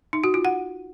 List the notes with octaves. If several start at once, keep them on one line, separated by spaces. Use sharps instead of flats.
D#4
F#4
F4
F#5